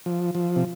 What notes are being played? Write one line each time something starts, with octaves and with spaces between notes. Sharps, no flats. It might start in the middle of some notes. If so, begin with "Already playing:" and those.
F3
F3
C3